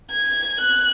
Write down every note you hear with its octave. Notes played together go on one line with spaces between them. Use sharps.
G#6
F#6